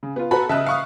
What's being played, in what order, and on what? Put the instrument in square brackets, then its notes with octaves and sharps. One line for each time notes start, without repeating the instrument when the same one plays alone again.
[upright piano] C#3
B3 F4
[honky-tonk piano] F#4 A4 [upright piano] B4 A#5 B5
[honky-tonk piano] C#3 A5 F#6 [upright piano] D#5 E5
[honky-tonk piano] F5 C#6 D#6